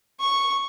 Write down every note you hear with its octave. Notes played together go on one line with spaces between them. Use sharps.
C#6